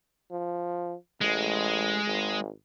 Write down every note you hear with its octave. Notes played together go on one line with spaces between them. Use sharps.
F3
A1 G#3
G#1